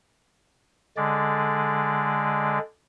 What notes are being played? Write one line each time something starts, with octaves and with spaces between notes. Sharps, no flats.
D3 G#3 D5